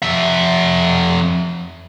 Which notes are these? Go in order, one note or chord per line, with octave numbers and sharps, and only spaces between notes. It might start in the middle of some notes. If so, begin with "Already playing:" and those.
F2 E5